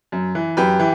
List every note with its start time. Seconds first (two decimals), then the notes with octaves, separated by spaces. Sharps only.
0.12 F#2
0.35 E3
0.57 F#2 G4 B4
0.79 E3